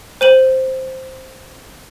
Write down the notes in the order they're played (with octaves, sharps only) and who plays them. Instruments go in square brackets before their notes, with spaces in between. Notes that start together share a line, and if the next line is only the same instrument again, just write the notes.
[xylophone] C5 D#7 F#7